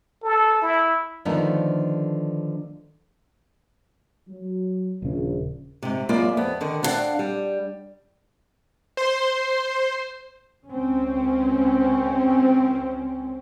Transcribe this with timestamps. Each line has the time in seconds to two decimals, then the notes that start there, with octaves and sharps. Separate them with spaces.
0.24 A4
0.62 E4
1.25 D3 D#3 F3 A3 B3 D4
4.29 F#3
5.02 D#1 A#1 C#3
5.82 G#2 C3
6.09 F#2 G#3 A#3 E4 F4 D5
6.37 F2 B3
6.61 D3 D#3 D#5
6.83 B3 C4 D4 D5 F5 F#5
7.19 G3
8.97 C5 C6
10.67 C#2 C4 C#4